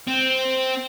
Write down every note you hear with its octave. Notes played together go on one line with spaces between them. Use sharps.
C4